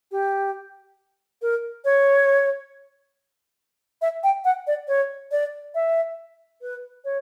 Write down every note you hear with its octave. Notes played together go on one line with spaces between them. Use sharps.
G4
A#4
C#5
E5
G5
F#5
D5
C#5
D5
E5
B4
C#5